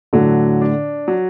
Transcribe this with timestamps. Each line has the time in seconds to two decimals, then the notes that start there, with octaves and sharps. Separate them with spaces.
0.13 A2 D3 F#3
0.61 D4
1.08 F#3